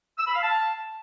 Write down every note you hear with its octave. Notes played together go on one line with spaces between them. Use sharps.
E6
B5
F5
A5